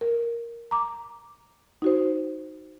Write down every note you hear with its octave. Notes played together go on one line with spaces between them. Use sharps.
A#4
A#5 D6
D#4 F#4 C5